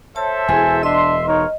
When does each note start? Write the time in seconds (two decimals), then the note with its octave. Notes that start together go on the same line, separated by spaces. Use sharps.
0.15 A4 C5 C#5 E5 A5
0.48 E1 E4 G#4 G#5 E6
0.83 D4 D#5 E5 C6
1.27 D#4 F4 A#4 C#5